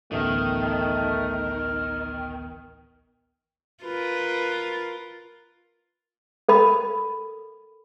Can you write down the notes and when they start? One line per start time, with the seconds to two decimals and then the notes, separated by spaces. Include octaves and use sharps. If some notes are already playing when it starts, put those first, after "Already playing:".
0.12 A1 D2 D#3 A3 B3 A#4
3.84 F4 A#4 B4
6.49 A4 A#4 B5